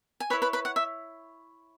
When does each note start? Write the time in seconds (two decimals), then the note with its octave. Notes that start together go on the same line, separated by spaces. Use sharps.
0.20 G#5
0.30 E4 B4 C#5 B5
0.42 B4 B5
0.53 B4 B5
0.65 F#5
0.76 E5